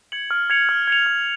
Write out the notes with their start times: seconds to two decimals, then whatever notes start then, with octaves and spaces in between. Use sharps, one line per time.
0.12 G#6 C#7 F#7
0.31 F6
0.50 G#6 C#7 F7
0.69 F6
0.88 G#6 C#7 F7
1.06 F6